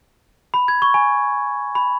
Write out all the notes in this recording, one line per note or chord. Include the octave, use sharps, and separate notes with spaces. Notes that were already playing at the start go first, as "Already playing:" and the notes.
B5
G#6
C#6
G#5
B5